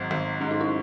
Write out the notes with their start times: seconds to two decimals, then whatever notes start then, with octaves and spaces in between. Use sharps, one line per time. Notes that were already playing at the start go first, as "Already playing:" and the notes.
Already playing: G#1 G#2 F#3
0.11 G#1
0.41 G#2 C#4
0.51 D#4
0.61 E4